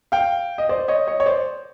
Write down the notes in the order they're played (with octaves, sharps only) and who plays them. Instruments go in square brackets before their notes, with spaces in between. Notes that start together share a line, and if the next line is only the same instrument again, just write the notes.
[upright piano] F5 G5
D#5
C5 D5
C#5 D#5
C#5 D#5
C#5
C5 D5